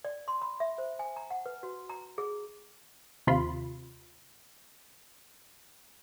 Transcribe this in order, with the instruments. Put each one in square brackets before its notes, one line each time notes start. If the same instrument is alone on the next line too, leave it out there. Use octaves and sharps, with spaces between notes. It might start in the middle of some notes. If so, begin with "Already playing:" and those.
[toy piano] D5
C6
B5
E5
C5
G#5
A#5
F#5
B4
F#4
A#5
G#4
[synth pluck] D#2 C3 F4 B5 C6